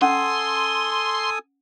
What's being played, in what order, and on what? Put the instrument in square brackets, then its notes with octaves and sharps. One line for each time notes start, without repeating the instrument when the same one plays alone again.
[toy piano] C#4 F#5 [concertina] A4 G#5 D#6 [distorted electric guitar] C6